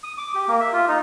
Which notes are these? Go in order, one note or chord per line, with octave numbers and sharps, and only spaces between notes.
D#6
D6
G4
A#3
E5
F4
D#4